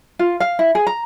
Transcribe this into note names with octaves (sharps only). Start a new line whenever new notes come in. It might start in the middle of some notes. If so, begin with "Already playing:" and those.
F4
F5
E4
G#4
A#5